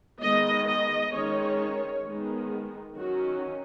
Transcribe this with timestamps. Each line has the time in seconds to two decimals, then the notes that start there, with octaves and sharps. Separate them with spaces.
0.21 D#3 G#3 B3 D#5
0.66 D#5
1.13 D#3 G#3 C#4 C#5
2.04 D#3 G#3 B3
2.95 D#3 F#3 C#4 F#4